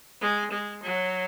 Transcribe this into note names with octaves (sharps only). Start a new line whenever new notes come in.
G#3
G#3
F#3